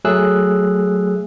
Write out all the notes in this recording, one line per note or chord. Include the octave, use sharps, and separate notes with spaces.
F#3 A3 G#4 E6 F#6